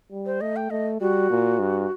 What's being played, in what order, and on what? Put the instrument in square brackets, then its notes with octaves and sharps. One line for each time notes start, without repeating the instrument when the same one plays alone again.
[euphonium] G3
[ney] C5
[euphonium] A3 [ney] D#5
[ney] G5
[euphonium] A3 [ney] D#5
[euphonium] G3 [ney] F#4
[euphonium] A#2
G2